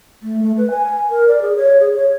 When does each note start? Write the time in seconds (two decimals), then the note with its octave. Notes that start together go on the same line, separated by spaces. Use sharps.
0.23 A3
0.43 A3
0.57 B4
0.71 G#5
1.10 A#4
1.28 D5
1.42 G#4
1.57 C#5
1.80 G#4
1.95 C#5